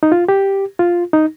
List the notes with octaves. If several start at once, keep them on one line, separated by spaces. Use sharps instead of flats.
D#4
F4
G4
F4
D#4